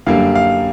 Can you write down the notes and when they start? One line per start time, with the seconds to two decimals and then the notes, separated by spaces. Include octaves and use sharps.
0.06 F#2 D3 G3 A#3 F5
0.35 F5